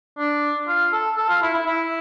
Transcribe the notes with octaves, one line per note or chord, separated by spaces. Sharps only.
D4
F4
A4
A4
F4
E4
E4
E4